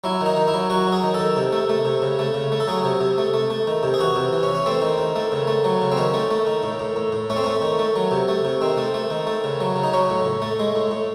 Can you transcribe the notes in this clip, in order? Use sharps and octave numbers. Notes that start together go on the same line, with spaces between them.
F#3 E4
D#3 D#4
D#3
E4
F#3
F#3 F#4
F#3
G#4
D#3
A4
D#3
C3
A3
A3
C3
C#3
A3
C#3
A3
A4
F#3 G#4
C3
C3
A3
A3
A3
D#3
C3
G#4
E3 F#4
C3
E3
C#4
E3
C#4
A3 C4
D#3
D#3
A3
C#3
A3
F#3
C#3
C4
D#3 C#4
A3
A3
D#3
A2
A2
A2
A2
A3 C#4
C4
A3 C#4
D#3
A3
F#3
C3
A3
C3
D#3 C4
A3
A3
D#3
A3
C#3
F#3
C#3
D#4
F#3 C#4
A2
A2
A3
G#3
A2
A2